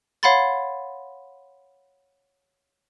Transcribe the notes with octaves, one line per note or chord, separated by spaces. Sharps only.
C#5 F5 F#5 B5 C6 A6